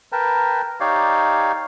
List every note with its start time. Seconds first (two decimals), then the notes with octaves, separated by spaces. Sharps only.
0.12 A#4 B4 G5 A5
0.80 D#4 G4 C#5 D5 F5